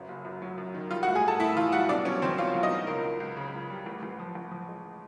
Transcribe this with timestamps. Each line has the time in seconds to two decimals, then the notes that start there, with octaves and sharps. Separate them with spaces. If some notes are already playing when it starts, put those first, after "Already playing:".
Already playing: G1 F#2
0.09 F#1
0.25 F#2
0.42 F#3
0.58 F#2
0.74 D#3
0.91 G3 F4 F5
1.03 F#4 F#5
1.07 A2
1.15 G#4 G#5
1.24 A2 A4 A5
1.40 A2 E4 E5
1.56 E3 F4 F5
1.72 G3 F#4 F#5
1.89 B2 D4 D5
2.05 F#3 C#4 C#5
2.22 E2 C4 C5
2.38 B2 F4 F5
2.55 F#3
2.63 D#4 D#5
2.71 F#3
2.87 C#2 A#4
3.04 C#2
3.20 C#2
3.37 C#3
3.54 C#2
3.70 G3
3.86 A1
4.03 A1
4.19 F3
4.35 A1
4.51 F3
4.68 G#3